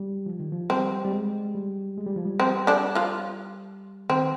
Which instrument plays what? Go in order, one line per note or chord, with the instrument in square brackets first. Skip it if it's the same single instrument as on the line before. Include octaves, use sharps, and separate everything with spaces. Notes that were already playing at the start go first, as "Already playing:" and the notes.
Already playing: [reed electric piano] G3
F3
D#3
F3
[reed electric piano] G3 [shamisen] C4
[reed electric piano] G3
G#3
G3
G#3
G3
F3
G3
[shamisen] C4
D3 D4
F3 F4
[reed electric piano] D#3 [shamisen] C4